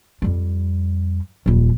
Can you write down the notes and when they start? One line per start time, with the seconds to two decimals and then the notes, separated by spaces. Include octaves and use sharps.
0.22 F2 G3
1.46 D#1 F2